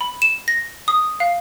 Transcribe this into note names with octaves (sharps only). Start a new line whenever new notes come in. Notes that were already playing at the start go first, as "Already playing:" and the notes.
B5
E7
A#6
D#6
F5